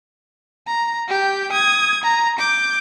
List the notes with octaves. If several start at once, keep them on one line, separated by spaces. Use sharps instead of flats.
A#5
G4 G6
D#6 G#6
A#5
D6 G6